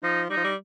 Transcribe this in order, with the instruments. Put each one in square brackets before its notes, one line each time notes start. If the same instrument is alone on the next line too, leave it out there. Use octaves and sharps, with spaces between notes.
[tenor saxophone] F3 [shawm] D#4
[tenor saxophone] G3 [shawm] D#4
[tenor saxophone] F3
G3